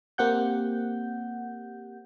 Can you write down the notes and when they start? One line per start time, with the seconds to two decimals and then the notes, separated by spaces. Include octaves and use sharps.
0.18 A#3 C4 G4 F#5 G6